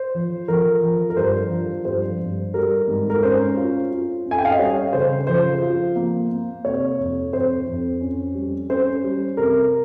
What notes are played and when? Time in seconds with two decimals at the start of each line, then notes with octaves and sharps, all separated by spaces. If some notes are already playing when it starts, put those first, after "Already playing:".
Already playing: C5
0.15 F3
0.48 F3 A#4
0.83 F3
1.10 A#4
1.17 G2 C5
1.51 F3
1.85 G2 C5
2.19 G2
2.54 G3 A#4
2.88 G#2
3.10 A#4
3.23 C#4 C5
3.57 F4
3.91 F4
4.25 C#4
4.31 G#5
4.38 G5
4.45 F5
4.51 D#5
4.59 G3 C#5
4.93 C#3 C5
5.27 F3 C5
5.62 F4
5.96 A#3
6.30 A#3
6.65 C3 C#5
6.98 F2
7.32 F2 C5
7.67 F2
8.01 C#4
8.35 G3
8.69 C#4 C5
9.04 G3
9.37 C3 A#4